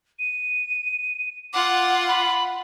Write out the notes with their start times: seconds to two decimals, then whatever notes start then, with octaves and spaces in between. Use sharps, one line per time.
0.19 D#7
1.53 F4 F#5 D6
2.08 B5